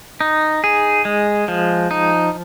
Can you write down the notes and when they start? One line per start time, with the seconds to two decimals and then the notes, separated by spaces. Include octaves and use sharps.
0.21 D#4
0.64 G#4
1.05 G#3
1.48 F3
1.91 D#4